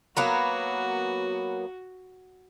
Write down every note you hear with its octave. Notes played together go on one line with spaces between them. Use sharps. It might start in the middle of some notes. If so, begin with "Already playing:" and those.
F#3 A#3 B3 F#4